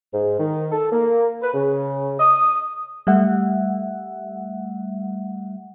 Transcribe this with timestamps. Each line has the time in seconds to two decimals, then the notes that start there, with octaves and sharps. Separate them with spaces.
0.12 G#2
0.39 D#3
0.72 A4
0.92 A#3
1.42 B4
1.54 C#3
2.20 D#6
3.07 G3 A3 E5 F#5